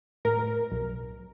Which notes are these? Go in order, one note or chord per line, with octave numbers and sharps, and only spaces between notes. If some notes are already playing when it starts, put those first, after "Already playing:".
A2 A#4
B1